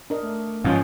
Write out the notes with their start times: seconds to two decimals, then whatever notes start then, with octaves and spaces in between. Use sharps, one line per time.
0.10 D4 A#4 D#5
0.22 A3
0.64 G#2 F3 C#4 F5